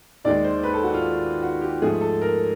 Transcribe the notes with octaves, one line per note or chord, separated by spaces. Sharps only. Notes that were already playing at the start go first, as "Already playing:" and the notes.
D#2 D#3 G#3 D5
C5
B4
A4
F#4
F4
F#4
G4
G#2 F3 A3 G#4
A4
A#4